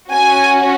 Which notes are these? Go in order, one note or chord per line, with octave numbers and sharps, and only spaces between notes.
C#4 F#4 G#5